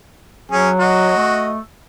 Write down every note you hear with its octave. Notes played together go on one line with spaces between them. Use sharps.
F#3 C#4 G#4
F#4 D#5
A3